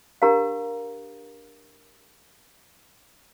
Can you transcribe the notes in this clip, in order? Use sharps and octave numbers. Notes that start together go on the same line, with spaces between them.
D4 G4 A#4 F5 A#5